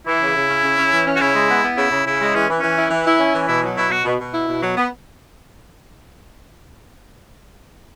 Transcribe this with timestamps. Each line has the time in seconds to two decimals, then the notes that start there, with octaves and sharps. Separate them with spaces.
0.07 E3 E4
0.22 C#3
0.36 C#3
0.49 C#4
0.64 C#3
0.77 C#4
0.93 E3
1.06 C#4
1.16 F#4
1.20 C#3 E4
1.34 G#3
1.49 B3
1.63 B3
1.77 C#3 E4
1.92 C#3
2.06 C#3 E4
2.21 G#3
2.35 E3 C#4
2.49 E3
2.59 E3 C#4
2.77 E4
2.91 E3
3.06 E4
3.19 C#4
3.34 E3
3.48 B2 E4
3.63 F#3
3.77 B2 E4
3.90 B2 F#4
4.05 B2
4.20 B2
4.33 E4
4.48 B2
4.62 F#3
4.77 B3